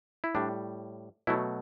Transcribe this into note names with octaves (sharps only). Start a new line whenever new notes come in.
E4
A2 G3 D4
B2 F#3 A3 E4